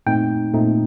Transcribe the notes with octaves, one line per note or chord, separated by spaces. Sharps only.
A#2 A3 C4 D#4 G5
A#2 A3 C4 D#4